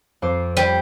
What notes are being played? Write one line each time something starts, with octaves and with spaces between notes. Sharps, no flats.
F2 C5 D6
G3 C5